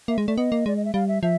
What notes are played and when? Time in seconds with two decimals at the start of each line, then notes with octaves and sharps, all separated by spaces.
0.08 A#3 E5
0.18 G#3
0.27 A3 D5
0.37 B3 D#5
0.52 A#3
0.66 G#3 D5
0.77 D#5
0.85 E5
0.94 G3 F5
1.08 E5
1.23 F3 E5